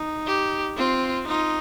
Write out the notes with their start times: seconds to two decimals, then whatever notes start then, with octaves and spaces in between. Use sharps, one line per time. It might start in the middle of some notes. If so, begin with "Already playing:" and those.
Already playing: D#4
0.27 G4
0.77 C4 F4
1.27 D#4 F4